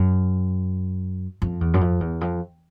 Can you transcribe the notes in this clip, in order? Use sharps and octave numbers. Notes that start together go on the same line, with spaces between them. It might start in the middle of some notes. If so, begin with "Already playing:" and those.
Already playing: F#2
F2
E2
F#2
F2
E2
F2